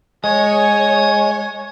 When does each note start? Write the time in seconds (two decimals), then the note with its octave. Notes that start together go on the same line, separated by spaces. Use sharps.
0.24 G#3 C#5 D#5 G#5